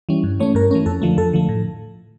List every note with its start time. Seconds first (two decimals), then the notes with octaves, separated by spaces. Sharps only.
0.09 E3 G3 C#4
0.23 G2
0.40 E3 A3 C#4 C#5
0.55 G2 A#4
0.71 E3 A3 C#4
0.86 F2 A4
1.02 D3 F3 A3
1.18 F2 A4
1.33 D3 F3 A3
1.49 A2